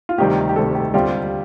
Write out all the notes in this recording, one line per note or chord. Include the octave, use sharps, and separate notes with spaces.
F4
D2 C3 D#3 G3 G4
G4
D2 C3 D#3 G3 A4
G4
D#2 D3 G3 C4 F4 G4